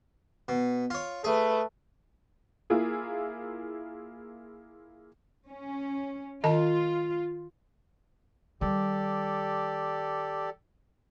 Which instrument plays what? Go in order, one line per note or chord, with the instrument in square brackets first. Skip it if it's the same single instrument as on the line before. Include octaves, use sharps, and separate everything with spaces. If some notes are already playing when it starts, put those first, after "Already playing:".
[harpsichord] B2
F4 C#5
[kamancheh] A3 B4 [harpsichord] G#4
[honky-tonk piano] A#3 E4 F4 G#4
[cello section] C#4
[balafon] D#3 D#5 A5 [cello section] F4
[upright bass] D#3 G3 [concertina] G4 A4 D5